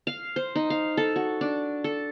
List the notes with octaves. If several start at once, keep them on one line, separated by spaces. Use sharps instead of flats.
F5
C5
D#4
F5
A4
F#4
D4
A4